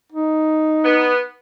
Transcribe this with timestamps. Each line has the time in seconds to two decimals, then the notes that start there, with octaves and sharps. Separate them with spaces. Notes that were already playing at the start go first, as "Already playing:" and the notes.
0.12 D#4
0.84 B3